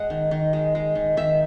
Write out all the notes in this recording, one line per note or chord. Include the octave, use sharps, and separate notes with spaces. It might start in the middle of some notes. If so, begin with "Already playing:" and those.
Already playing: G#3 F#5
D#3
D#3
G#3
G#3
D#3
D#3 E5